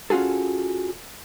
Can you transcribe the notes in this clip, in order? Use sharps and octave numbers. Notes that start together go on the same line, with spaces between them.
C#4 F4 F#4 G#4 A4